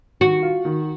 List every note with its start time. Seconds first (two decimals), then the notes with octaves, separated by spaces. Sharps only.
0.21 D#3 F#4
0.43 F4
0.65 D#3